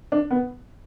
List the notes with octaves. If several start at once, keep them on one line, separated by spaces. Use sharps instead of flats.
D4
B3